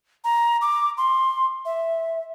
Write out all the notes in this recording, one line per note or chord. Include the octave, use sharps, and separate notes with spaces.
A#5
D6
C6
E5